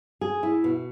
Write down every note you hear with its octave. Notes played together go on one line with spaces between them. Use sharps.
G#4
E4
B2